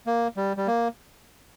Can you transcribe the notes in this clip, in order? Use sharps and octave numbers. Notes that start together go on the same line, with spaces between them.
A#3
G3
G3
A#3